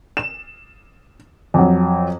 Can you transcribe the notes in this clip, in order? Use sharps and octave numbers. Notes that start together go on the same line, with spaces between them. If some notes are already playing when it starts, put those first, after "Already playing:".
E7
F2 F#3